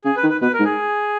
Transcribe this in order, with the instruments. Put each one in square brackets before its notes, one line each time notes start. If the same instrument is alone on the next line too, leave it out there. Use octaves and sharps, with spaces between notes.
[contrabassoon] C#3 [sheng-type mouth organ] G#4
[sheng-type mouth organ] B4
[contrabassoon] D#3
[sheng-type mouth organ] B4
[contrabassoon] B2 [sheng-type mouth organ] B4
[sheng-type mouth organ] A#4
[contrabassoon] G#2
[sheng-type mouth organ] G#4